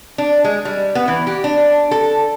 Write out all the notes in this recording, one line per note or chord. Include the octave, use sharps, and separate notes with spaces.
D4
G#3
G3
B3
E3
G4
D4
A4